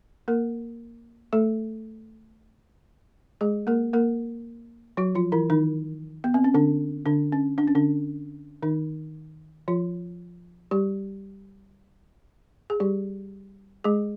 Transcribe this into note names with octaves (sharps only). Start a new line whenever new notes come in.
A#3 A#4
A3 A4
G#3 G#4
A#3 A#4
A#3 A#4
F#3 F#4
F3 F4
E3 E4
D#3 D#4
B3
C4
C#4
D3 D4
D3 D4
C#4
D4
C#4
D3 D4
D#3 D#4
F3 F4
G3 G4
G#4
G3 G4
G#3 G#4